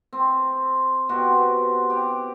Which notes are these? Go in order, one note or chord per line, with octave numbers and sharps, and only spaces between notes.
C4
B2 C4 F#4 G4
G4